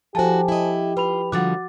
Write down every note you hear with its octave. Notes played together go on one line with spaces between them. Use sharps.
F3 E4 F#4 G4 A4 C5 G#5 A5
E4 D#5
F4 B4 B5 F7
D3 F3 G3 F#4 F#5 D6 A6